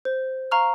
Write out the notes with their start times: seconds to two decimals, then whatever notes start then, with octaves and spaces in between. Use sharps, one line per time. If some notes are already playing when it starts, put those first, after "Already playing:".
0.05 C5
0.51 F5 A#5 C#6 F6